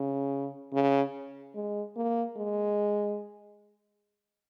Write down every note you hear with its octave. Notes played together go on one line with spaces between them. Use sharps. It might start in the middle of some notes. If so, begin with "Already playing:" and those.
Already playing: C#3
C#3
G#3
A#3
G#3